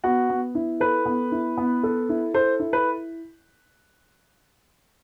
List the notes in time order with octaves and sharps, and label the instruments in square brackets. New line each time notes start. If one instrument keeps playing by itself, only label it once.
[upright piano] B3 [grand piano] F#4
[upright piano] B3
E4
[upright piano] A4 [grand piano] B4
[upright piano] B3
E4
B3
A4
E4
[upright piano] A4 [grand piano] C5
[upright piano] E4
[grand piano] B4